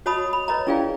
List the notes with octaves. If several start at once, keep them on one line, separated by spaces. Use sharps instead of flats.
F#4 C#5 D#5 A5 B5 D#6
B5
B4 C#5 D#5 A#5
C#4 E4 G#4 D5 F5 G5